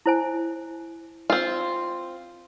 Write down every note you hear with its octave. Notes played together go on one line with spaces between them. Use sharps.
E4 C5 G#5
C4 F4